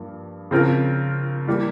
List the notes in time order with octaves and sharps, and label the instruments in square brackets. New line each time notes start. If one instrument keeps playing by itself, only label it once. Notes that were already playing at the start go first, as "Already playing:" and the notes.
Already playing: [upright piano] G2 F3 A#3
C#3 F3 C4 F4 A#4
E3 G3 A#3